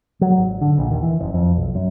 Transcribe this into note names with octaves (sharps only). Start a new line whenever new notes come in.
F#3
G#1
D3
A#1
D#2
E3
F#1
F2
B1
F#2